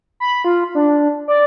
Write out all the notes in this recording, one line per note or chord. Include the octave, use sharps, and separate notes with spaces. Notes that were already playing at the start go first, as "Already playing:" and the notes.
B5
F4
D4
D5